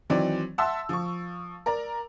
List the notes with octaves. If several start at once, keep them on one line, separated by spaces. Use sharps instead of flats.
D#3 E3 F#3 C4 D5
E5 F#5 A5 C6 E6
F3 C#6
A#4 D5 A#5